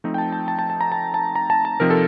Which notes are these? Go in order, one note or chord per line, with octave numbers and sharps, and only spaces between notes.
F3 A3 C4 D#4
G5
A5
A5
A5
A5
A5
A#5
A5
A5
A#5
A5
A5
C3 F3 C4 D#4 A#4
A4